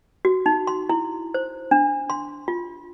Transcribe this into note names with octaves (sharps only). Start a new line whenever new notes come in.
F#4
D#4
C6
E4
C5
D4
C6
F4